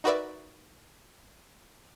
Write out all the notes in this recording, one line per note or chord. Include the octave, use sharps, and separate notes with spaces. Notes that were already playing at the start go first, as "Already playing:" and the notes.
D#4 F#4 A#4 B4 D5 E5